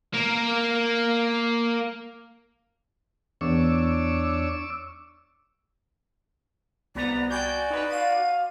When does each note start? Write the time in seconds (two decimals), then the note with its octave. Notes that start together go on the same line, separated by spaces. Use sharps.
0.13 A#3 A#4
3.41 E2 D4 C#5 C#6 D6 E6
6.95 C2 B3 D5 A#5
7.30 F#4 D5 G5 G#5 G6
7.70 D#4 B4
7.90 F5 D#7